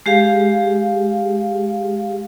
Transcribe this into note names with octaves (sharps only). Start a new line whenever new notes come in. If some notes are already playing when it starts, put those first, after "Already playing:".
G#3 G4 G#4 F5